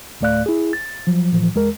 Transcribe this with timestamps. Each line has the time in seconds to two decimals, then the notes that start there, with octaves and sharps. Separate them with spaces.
0.21 D2 A2 A3 D5 F5 F#6
0.46 E4 G#4
0.73 A6
1.07 F3 F#3
1.32 A2 E3 F3
1.55 E2 G#3 A#4